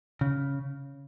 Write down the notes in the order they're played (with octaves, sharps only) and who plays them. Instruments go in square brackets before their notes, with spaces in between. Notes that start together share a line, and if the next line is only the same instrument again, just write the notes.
[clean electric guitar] C#3